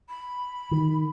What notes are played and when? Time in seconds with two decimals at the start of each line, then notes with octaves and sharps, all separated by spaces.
0.09 B5
0.71 D#3